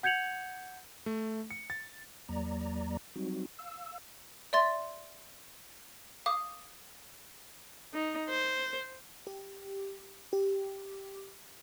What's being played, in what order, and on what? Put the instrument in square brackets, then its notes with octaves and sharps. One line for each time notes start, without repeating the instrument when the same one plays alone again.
[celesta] F#5 G6 G#6 C#7 F7 F#7
[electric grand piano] A3
C#7
A6
[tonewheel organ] E2 F#3 A#3 D5 A#5
F#3 G3 C4 D#4 F#4
F5 E6
[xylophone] D5 E5 C6 A6
F5 D6 D#6
[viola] D#4
C5
[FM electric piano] G4
G4